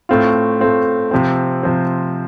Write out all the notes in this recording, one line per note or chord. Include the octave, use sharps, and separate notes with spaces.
A2 A3 C4 F4
A2 A3 C4 F4
C3 F3 C4
C3 F3 C4